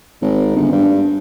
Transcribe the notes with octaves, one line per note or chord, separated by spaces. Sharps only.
G#1
G1
G2